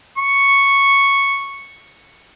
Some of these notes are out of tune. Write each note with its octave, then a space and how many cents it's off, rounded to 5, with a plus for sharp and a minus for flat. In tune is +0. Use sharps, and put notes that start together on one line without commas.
C#6 +0